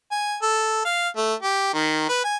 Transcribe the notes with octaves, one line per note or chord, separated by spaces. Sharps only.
G#5
A4
F5
A3
G4
D#3
B4
G#5